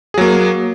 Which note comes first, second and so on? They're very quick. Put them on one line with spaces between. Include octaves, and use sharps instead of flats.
G#4 F#3 A#3